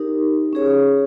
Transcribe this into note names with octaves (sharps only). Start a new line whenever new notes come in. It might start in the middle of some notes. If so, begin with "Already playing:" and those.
Already playing: D#4 G4 A#4
C#4 G#4 C#5